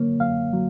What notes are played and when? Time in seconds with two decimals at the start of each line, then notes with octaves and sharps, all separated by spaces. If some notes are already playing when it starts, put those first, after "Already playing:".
Already playing: F#2 D3 F#3 A#3 C#5
0.20 F#2 F5
0.53 F#3